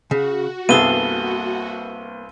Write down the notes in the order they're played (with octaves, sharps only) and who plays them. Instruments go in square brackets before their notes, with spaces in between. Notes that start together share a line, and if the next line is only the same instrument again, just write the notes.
[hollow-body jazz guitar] C#3 [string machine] F#4
[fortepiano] C2 G2 B3 [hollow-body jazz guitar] A#3 G#4 A4 [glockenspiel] D#7 G7